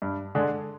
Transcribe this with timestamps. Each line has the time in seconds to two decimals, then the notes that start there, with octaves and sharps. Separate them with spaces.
0.02 G2
0.35 D3 G#3 D4 G#4